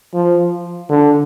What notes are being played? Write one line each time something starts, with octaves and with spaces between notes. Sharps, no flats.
F3
D3